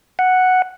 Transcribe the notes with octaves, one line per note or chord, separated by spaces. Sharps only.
F#5